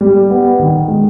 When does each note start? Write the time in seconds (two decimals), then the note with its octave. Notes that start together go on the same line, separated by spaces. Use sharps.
0.01 G3
0.30 B3
0.59 D#3
0.88 G#3